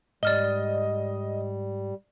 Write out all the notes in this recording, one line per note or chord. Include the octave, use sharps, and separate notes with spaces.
G#2 G3 D5 D#5 F6 G7